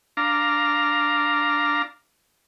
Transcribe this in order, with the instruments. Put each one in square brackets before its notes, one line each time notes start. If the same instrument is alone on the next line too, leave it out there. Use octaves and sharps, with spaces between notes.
[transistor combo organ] D4 F5 A#5